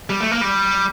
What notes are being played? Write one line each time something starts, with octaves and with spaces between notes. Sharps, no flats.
G3
A3
A#3
G3